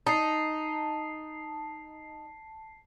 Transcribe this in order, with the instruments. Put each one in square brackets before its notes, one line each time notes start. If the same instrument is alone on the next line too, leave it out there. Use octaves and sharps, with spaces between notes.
[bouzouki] D#4 [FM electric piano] A5 C7